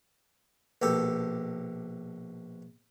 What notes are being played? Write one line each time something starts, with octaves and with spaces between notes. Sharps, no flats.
A#1 B2 G4 A4